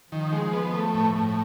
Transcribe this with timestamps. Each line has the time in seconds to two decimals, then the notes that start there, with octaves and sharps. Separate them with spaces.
0.11 D#3 F3
0.33 G#3
0.53 B3
0.73 A3
0.94 A2
1.15 A2